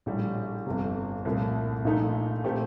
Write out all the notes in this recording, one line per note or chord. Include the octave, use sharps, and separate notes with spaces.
A#1 A2 G3
G1 F2 C3
C2 A#2 F3 A3
A#1 A#2 A3 D#4
A#2 A3 C4 G4